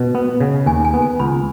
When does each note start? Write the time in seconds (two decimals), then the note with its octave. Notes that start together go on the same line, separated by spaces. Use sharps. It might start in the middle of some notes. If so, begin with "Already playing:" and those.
Already playing: B2
0.15 B3
0.40 C#3
0.66 D#2 G#5
0.85 G#5
0.94 B3
1.02 G#5
1.20 C#2 B5